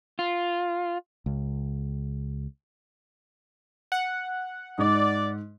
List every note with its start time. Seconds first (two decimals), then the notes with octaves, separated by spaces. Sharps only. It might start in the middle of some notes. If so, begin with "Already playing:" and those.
0.19 F4
1.26 C#2
3.92 F#5
4.78 G#2 D5